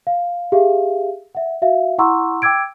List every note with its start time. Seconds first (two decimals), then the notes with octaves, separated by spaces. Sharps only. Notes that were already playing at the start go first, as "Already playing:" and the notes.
0.07 F5
0.52 G4 G#4 E5 F5
1.35 E5 F#5
1.62 F#4 E5 F5
1.98 E4 F#5 A#5 C6 C#6 E6
2.42 G5 D6 E6 G#6 D7